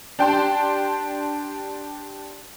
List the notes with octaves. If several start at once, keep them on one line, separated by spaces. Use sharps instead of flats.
D4 G4 G5 A5 C6